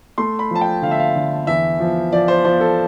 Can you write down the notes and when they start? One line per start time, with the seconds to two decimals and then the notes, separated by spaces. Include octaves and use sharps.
0.18 A3 C6
0.39 B5
0.51 F3 A5
0.61 G5
0.82 D3 F5
0.91 E5
1.00 F5
1.16 D3
1.47 E2 E5
1.80 F3
2.12 F3 D5
2.28 C5
2.44 F3 C5
2.61 A4